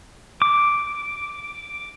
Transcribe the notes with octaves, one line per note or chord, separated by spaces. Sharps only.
D6